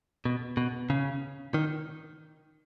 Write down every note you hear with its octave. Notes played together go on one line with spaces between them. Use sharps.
B2
B2
C#3
D#3